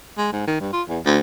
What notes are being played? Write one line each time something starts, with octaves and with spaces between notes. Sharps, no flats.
G#3
G#2
D#3
G2
F4
E2
D2